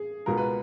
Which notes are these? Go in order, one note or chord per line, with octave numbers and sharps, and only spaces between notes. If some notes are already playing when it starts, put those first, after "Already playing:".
Already playing: G#4
C#2 B2 G#3 A#4
B4